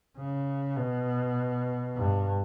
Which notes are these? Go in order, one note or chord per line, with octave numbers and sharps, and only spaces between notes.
C#3
B2
G2